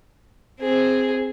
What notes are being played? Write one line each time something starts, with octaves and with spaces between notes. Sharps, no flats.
C4 G#4